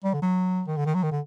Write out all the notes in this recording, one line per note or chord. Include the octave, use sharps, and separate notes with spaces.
G3
D3
F#3
D#3
D3
D#3
F#3
D#3
D3